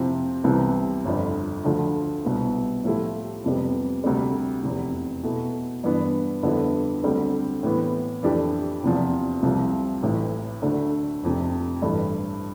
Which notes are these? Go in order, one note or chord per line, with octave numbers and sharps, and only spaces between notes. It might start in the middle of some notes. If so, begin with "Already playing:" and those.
Already playing: F2 C3 F3 C4 E4
C2 C3 E3 B3
G1 F2 D3
D2 D3 F3
C2 B2 B3
A2 F3 A3 E4 G4
F2 C3 G3 B3
D2 C3 G3
F1 E2 C3
B2 A3 E4
G2 E3 B3 D4
F2 D3 G3 B3 E4
D2 D3 G3 C4
A2 E3 B3
F2 E3 A3 D4 G4
E2 C3 F3
C2 C3 F3
A1 A2 E3
D2 D3 A3 D4
F1 F2 C3
A1 G2 E3 A3